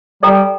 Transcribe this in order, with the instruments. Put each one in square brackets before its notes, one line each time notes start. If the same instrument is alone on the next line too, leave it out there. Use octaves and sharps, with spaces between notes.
[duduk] G3 [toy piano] A4 D5 G5 A#5